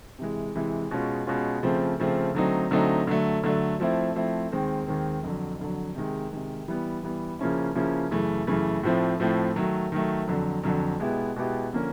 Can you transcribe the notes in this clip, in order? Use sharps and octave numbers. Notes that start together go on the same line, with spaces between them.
C3 E3 G#3
C3 E3 G#3
B2 G#3 C#4 F4
B2 G#3 C#4 F4
C#3 F3 A3 C4
C#3 F3 A3 C4
D3 F#3 A3 C4 D#4
D3 F#3 A3 C4 D#4
D3 F#3 A3
D3 F#3 A3
F3 A3 C4 E4
F3 A3 C4 E4
D#2 D#3 G#3 C4
D#2 D#3 G#3 C4
F2 D3 F#3
F2 D3 F#3
C3 D#3 G#3
C3 D#3 G#3
E3 G3 B3
E3 G3 B3
C#3 F3 A#3 C#4 E4
C#3 F3 A#3 C#4 E4
F#2 C#3 E3 A3
F#2 C#3 E3 A3
A2 F3 A3 C4
A2 F3 A3 C4
D#3 F#3 A3
D#3 F#3 A3
F2 D3 F#3
F2 D3 F#3
B2 G#3 B3 E4 G4
B2 G#3 B3 E4 G4
D3 F3 A#3 C#4